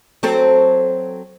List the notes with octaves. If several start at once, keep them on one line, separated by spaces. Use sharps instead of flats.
F#3 C4 A4